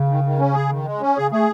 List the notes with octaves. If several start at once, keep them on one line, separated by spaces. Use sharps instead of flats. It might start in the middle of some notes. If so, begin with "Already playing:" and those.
Already playing: C#3
D#3
D#3
C#4
G#4
D#3
G#3
C#4
C#3 G#4
A3 G#4